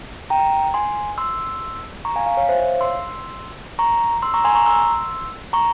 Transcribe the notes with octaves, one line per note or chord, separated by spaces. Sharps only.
G5 A#5
G#5 C6
C6 E6
A#5 C#6
F5 G#5
F5 G#5
C#5 F5
C5 E5
C#5 F5
C6 E6
A#5 C#6
C6 E6
A#5 C#6
G#5 C6
A#5 C#6
C6 E6
A#5 C#6